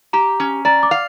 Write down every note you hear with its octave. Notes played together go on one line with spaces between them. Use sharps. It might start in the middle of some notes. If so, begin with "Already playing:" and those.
G4 A#5
C#4
D5 A#5
D6
F5